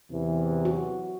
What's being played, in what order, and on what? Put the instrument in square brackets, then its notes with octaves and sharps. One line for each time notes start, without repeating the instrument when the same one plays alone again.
[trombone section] E2 C3 E3
[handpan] F#4